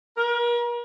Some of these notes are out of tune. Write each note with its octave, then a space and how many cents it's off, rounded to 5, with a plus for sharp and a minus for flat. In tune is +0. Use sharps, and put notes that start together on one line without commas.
A#4 +40